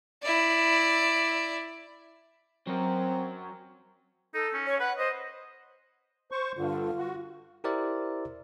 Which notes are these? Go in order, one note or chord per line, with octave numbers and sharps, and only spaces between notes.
E4 D5
F#3 C4 A#4
D#4 A4
C#4
C#5
B4 F#5
C5 D#5
C5 C#6
G2 D3 F4
F#4
E4 G4 A#4 C5 D5 E5